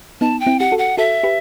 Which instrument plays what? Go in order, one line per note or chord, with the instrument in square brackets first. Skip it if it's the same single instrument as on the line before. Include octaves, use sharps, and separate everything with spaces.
[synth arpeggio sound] B3 D#4 [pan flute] A5
[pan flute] G5
[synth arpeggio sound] C4 E4
[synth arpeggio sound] G4 [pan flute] F#5
[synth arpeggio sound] F#4 A4
[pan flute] F#5
[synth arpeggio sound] F#4 A4 [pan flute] E5
[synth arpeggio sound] G4 B4